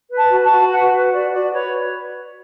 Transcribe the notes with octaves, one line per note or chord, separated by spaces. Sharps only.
B4
A5
F#4
A5
F#4
B4 F#5
B4
F#4 D5
F#4 D5
B4 C#5